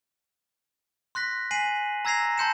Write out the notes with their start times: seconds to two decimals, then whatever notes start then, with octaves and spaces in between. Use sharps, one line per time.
1.15 C6 F#6 A#6 B6
1.51 G#5 B6 C7 D#7 F#7
2.05 A#5 E6 G#6 A#6 C7 F7
2.38 A5 C6 G6 C#7 E7